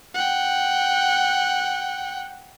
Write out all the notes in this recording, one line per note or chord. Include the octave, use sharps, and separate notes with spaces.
F#5 G5